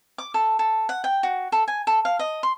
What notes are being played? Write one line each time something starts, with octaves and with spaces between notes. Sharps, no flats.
D6
A4
A4
F#5
G5
F#4
A4
G#5
A4
F5
D#5
C6